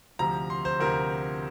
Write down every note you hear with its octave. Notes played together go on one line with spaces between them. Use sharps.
D2 C3 F3 A#5
C6
C5
D2 C3 F3 A#4